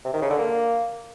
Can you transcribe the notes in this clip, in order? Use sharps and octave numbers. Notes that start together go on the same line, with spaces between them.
C3
D#3
C#3
D3
A#3